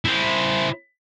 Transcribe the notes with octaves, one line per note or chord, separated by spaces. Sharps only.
E4 C5